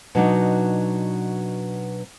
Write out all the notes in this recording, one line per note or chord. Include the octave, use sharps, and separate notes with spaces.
B2 F#3 D4 D#4